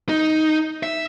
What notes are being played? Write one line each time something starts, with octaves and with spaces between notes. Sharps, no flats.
D#4
E5